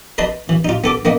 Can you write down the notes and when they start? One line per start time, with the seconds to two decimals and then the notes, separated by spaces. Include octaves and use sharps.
0.18 B4 D#5 A5 C6
0.49 E3
0.65 D#4 F4
0.84 B3 A4 D6
1.05 A#3 B3 D#5